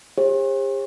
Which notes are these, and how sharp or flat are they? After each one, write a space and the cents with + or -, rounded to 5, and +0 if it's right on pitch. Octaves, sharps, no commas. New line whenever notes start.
G4 +45 C5 +45